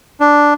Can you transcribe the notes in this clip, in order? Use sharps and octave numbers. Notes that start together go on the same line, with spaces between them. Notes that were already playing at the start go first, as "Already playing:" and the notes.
D4